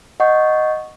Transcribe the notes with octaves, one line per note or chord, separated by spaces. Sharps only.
D#5 F#5 C#6 G6